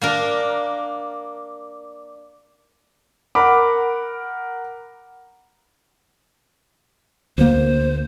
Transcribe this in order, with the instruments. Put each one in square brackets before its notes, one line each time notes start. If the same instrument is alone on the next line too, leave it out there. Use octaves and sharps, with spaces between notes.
[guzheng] A#3 D4 A#4
[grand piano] A#4 F#5 B5 D6
[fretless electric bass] D2 A#3 [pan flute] C5